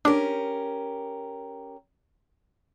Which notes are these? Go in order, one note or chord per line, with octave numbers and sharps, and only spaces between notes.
C#4 D4 G4 A#4